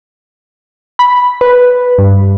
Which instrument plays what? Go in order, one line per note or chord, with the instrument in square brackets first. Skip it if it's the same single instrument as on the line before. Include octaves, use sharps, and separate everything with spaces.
[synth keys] B5
B4
G2